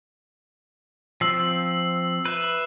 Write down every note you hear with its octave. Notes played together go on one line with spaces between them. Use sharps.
F3 C4 E6 C7
B4 E5